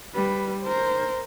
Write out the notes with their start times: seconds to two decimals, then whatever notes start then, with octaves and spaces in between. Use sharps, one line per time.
0.15 G3 B4
0.63 A#4 C5